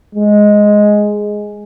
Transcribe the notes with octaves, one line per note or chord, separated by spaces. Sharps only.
G#3